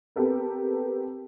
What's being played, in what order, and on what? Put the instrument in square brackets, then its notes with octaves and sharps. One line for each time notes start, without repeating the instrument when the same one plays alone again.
[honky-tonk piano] B3 C4 G4 A4 A#4